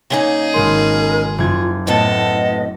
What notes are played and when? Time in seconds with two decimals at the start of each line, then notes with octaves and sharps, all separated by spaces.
0.10 C#3 A#3 D#4 G#4
0.54 G#1 G#3 A#4 C6
1.38 F#1 F#3 F4 G#6
1.87 A2 B3 C4 A4 D#5